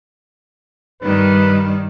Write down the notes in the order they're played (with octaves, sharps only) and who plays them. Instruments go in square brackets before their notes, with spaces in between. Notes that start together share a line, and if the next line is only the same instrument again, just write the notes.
[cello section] G2 D#3 G3 [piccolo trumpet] B4